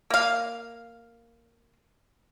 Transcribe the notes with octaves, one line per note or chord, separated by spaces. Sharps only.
A#3 F5